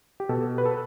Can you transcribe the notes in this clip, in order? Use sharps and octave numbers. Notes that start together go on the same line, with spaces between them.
G4
B2 A4
B4
A4